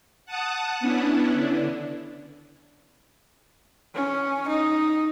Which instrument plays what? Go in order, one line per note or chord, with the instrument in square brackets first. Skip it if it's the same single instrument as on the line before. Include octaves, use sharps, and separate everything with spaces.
[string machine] F#5 A5 D#6 F#6
B3 C#4 D4 E4
D3
[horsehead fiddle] C#4
D#4